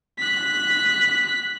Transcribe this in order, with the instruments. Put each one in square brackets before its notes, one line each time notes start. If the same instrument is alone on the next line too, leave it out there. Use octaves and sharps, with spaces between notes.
[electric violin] F#6 B6